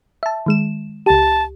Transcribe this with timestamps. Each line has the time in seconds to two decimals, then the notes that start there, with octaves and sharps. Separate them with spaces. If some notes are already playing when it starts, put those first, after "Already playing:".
0.23 E5 A5
0.46 D#3 G#3 E7
1.06 C#2 G4 A5